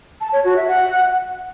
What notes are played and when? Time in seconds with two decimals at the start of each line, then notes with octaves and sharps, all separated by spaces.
0.21 A5
0.33 C#5
0.45 F#4
0.56 E5
0.68 F#5